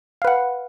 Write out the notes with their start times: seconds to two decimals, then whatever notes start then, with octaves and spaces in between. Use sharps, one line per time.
0.22 F5
0.25 B4
0.27 F#5